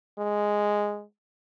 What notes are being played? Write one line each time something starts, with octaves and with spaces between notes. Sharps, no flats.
G#3